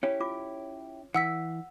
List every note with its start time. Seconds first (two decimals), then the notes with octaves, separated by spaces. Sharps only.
0.03 C#4 E4 G4 C#5
0.20 F4 D6
1.14 E3 F#5 E6 B6